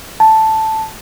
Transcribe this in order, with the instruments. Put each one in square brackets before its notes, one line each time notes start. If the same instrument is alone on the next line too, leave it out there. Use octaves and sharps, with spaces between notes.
[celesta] A5